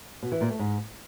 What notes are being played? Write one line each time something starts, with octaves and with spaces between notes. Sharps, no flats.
B2
E3
A#2
A3
G#2